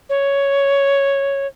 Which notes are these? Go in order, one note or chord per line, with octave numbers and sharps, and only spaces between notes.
C#5